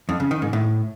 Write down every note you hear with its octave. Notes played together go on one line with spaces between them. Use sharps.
F2
C#3
D#3
G#2
A2